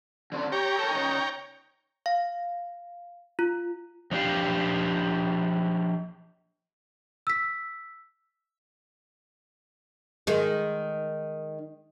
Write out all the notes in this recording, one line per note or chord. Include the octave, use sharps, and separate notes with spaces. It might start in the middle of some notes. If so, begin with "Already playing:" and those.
D3 C4 D5
G4 C#5 G5 A#5
A4 A#4
C#3 D#4
F5
F4
F3 D4 G4 F5
E6 B6
D#3 G#3